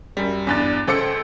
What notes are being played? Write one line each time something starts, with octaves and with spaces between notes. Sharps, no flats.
F#2 G3
E2 G2 A6
C#2 A4 C5 D6 E6 C#7